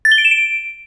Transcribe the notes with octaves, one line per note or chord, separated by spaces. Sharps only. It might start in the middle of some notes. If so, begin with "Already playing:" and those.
A6
G7
D7
E7
D7